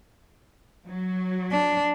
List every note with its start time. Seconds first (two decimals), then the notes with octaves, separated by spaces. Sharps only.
0.87 F#3
1.52 D4